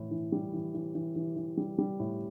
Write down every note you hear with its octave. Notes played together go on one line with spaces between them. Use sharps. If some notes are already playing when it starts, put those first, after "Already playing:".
Already playing: A2 E3
E3
G3
E3
E3
E3
E3
E3
G3
G3
A2